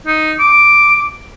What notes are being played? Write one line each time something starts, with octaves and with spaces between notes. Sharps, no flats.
D#4
D6